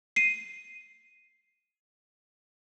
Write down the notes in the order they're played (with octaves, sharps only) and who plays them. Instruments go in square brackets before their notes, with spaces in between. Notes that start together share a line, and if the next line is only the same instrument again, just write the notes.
[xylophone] C7 D#7